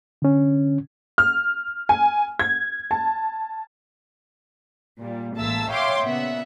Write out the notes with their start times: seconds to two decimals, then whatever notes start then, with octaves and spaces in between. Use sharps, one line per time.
0.22 D3 C#4
1.18 F6
1.89 G#5
2.39 G#6
2.91 A5
5.00 A#2 G3
5.37 A1 G#3 A#3 E5 A5 E6
5.69 C#5 E5 F5 G5 C6 D6
6.03 A#2 C#3 B3 E5 F#5